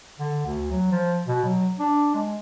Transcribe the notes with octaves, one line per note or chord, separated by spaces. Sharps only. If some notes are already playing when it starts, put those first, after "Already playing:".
D3
D2
F#3
F3
B2
F#3
D4
G#3